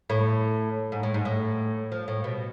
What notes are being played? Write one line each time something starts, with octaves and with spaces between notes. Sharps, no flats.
A2
G#2
A2
G#2
A2
F3
A2
B2